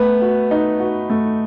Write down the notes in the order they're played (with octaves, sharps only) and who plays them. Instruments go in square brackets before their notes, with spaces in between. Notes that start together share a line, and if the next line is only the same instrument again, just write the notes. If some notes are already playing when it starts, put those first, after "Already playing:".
Already playing: [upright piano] A3 B4 [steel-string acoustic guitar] B3
[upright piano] F#4
D#4
F#4
A3